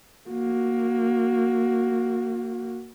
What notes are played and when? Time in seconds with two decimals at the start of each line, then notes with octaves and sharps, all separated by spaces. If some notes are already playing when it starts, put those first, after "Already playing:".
0.30 A#3 F#4